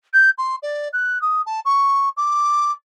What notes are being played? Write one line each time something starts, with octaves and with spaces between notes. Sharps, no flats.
G6
C6
D5
F#6
D#6
A5
C#6
D6